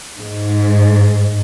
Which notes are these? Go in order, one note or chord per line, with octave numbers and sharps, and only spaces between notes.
G#2